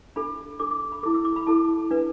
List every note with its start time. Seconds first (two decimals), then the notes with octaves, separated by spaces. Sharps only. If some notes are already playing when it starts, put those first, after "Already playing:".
0.16 D4 A4 B5
0.59 D4 A4 D6
0.71 D6
0.92 B5
1.03 E4 A4 D6
1.14 E6
1.25 D6
1.36 B5
1.47 E4 A4 A5
1.91 D4 B4